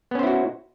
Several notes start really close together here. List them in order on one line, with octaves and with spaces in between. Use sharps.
B3 C#4 C5 E4 F#4